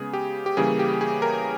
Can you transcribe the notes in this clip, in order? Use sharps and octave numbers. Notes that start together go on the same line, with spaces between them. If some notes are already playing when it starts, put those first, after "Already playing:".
Already playing: C#3 G#3 B3 G#4
G4
G4
C#3 E3 G3 A#3 C#4 G#4
G4
G#4
A#4